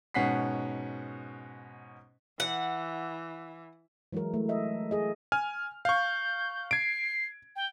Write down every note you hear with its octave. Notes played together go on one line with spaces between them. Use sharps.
G#2 B2 C#4 F#5 B6 C7
E3 F#5
E3 F#3 G#3 E4 A#4
A3
D#5 E5
G#4 D#5
G#5 F6
F5 C#6 G6
G#6 C7 D7
G5